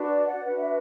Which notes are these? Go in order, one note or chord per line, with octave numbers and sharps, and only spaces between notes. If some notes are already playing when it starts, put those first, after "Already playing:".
Already playing: D4 F#4 B4
D5
D5 F#5
D4 F#4 B4 F#5
E5